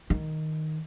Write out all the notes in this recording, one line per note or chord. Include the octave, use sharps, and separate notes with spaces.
D#3